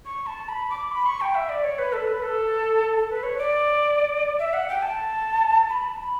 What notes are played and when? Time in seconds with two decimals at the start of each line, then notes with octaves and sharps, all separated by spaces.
0.05 C#6
0.26 A5
0.48 B5
0.70 D6
0.92 B5
1.06 C#6
1.21 G5
1.35 E5
1.49 D5
1.64 C#5
1.78 B4
1.93 A4
2.08 B4
2.23 A4
2.99 A4
3.09 B4
3.23 C#5
3.38 D5
4.39 E5
4.53 F#5
4.68 G5
4.82 A5
5.69 B5
5.84 A5
5.98 B5